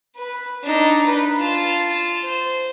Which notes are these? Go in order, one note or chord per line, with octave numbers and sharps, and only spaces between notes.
B4
D4 D#4
B4
F4 A5
C5